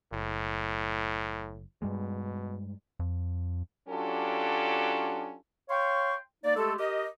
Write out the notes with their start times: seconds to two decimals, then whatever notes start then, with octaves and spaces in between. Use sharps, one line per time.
0.12 F#1 A2
1.82 G2 B2 G3 G#3
2.99 F2
3.89 F#3 C#4 D4 F4 G4 A4
5.69 C#5 F5 G5 C6 C#6
6.43 A#3 D#4 D5
6.56 G#3 A3 G4 A4
6.77 G4 A#4 D#5